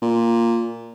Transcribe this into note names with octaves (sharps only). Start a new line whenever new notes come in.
A#2